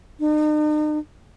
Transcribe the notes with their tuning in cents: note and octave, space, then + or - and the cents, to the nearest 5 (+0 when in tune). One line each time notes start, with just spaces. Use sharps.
D#4 -40